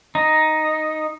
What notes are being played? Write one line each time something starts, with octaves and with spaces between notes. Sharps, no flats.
D#4